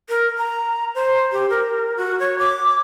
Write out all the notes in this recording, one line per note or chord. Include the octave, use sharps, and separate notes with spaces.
A#4
A#5
C5
G4
A#4
F#4
C#5
D6